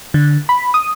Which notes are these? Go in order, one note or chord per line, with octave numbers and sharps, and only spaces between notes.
D3
B5
D#6